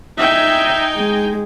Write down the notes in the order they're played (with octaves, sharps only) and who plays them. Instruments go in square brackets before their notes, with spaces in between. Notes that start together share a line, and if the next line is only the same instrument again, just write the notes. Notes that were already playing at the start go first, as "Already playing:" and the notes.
[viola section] D#4 G5 G#5 [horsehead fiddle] E5
[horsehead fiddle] G#3